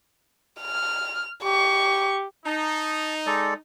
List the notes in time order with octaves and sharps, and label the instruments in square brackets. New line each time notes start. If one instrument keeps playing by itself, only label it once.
[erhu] F6
[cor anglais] G4 [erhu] C#6
[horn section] D#4 [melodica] A5
[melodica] G#3 A4 D5